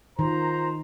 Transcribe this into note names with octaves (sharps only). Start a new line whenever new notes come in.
D#3 F4 C5 A#5